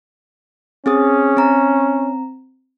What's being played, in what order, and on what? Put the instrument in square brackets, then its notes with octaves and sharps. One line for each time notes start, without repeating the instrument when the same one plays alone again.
[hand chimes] C4 G#4 D#6 [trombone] C#4
[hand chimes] C4 A#5